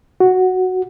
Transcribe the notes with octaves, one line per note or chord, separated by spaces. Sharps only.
F#4